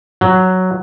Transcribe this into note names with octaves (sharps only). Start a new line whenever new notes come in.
F#3